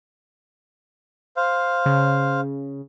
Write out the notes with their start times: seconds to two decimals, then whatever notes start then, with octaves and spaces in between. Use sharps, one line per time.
1.37 C5 F5
1.86 C#3